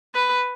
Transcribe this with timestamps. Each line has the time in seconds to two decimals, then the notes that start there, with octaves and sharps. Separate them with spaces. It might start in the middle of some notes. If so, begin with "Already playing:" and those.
0.15 B4